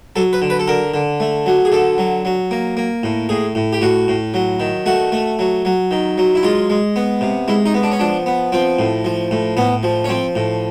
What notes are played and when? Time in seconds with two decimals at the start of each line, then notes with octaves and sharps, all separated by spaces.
0.16 F#3 A4
0.33 B4
0.42 D3
0.50 B4
0.59 A4
0.68 D3 A#4
0.94 D3
1.20 A3
1.46 F#3
1.65 G#4
1.72 D3 A4
1.98 F#3
2.25 F#3
2.51 A#3
2.77 A#3
3.03 A2
3.29 A2 G#4
3.55 A2
3.73 G4
3.81 A2 F#4
4.08 A2
4.34 F#3
4.60 D#3
4.86 A3 F#4
5.12 A3
5.39 F#3
5.65 F#3
5.91 D#3
6.18 F#3
6.35 E4
6.43 G#3 F4
6.70 G#3
6.96 B3
7.21 C3
7.48 G#3 E4
7.66 D#4
7.74 B3
7.83 D4
7.92 C#4
8.00 F3 D4
8.26 B3
8.52 F3 C4
8.79 A2
9.05 F3
9.31 A2
9.57 A2 B3
9.83 F3
10.04 C#4
10.09 F3 C4
10.35 A2